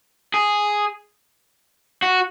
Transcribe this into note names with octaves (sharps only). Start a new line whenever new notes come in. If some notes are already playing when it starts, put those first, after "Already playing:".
G#4
F#4